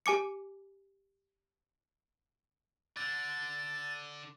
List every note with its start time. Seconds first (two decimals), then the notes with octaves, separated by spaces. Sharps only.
0.06 G4 G#5 D6 C#7
2.97 D3 A6